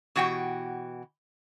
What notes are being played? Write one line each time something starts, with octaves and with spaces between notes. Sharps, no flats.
B2 E3 F#4 G4 G5